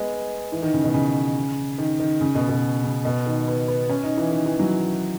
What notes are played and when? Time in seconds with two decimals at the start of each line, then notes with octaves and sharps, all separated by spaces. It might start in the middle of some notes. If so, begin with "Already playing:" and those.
Already playing: G#3 B3
0.52 E3
0.62 D#3
0.74 C#3
0.84 B2
0.94 C#3
1.78 D#3
2.00 D#3
2.21 C#3
2.35 B2
2.49 B2
2.84 C#3
3.05 B2
3.26 D#3
3.48 B3
3.68 B3
3.90 C#4
4.04 D#4
4.18 E3
4.31 D#3
4.46 E3
4.59 F#3